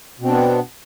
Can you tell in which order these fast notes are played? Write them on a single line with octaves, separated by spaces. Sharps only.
B2 C4 D4 B3